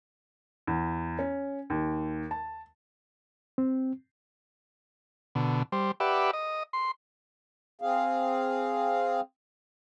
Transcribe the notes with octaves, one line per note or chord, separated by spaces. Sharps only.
E2
C#4
D#2
A5
C4
B2 D3
G3 C5
G4 B4 D5 E5 F#5
D#5
C6
C4 G#4 F5